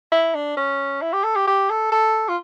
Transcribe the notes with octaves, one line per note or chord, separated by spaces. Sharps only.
E4
D4
C#4
E4
G4
A4
G4
G4
A4
A4
F4